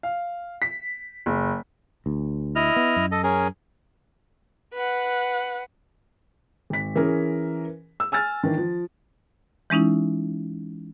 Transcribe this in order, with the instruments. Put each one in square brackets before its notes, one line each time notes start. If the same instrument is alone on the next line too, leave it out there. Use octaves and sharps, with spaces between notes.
[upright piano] F5
B6
F#1
[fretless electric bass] D2
[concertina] E4 D#5 F6
[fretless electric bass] B3
F#2
[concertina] A4 D#5
C#4 G#4 A#4
[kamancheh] B4 F#5
[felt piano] G#1 B6
E3 C#4 G#4 A#4
E6
G#5 E6 F6 A6
D#3 E3 D4
F3
[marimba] E3 G#3 C#4 D#4 E4